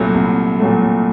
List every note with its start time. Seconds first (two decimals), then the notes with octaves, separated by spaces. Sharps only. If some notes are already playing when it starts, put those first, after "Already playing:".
Already playing: C2 A#2 F#3 A3
0.14 C2
0.60 A#2 F#3 A3